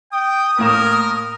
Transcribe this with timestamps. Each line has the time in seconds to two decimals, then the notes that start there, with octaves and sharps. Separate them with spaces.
0.12 G5 D#6
0.59 A2 A#3 A#4 E7